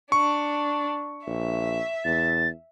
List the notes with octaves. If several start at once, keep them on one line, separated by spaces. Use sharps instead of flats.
D4 C#6
A#1 E5
E2 A6